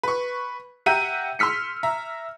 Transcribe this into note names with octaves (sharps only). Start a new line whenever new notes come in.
B4 C#6
G4 E5 F#5 A#5 G6 D#7
C6 E6 F6 B6 C#7
E5 A#5